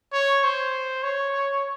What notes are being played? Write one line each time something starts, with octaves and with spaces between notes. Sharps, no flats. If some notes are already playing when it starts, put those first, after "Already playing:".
C#5
C5
C#5